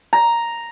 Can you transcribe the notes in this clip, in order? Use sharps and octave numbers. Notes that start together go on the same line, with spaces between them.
A#5